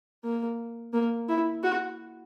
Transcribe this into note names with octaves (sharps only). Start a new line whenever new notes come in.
A#3
A#3
E4
F#4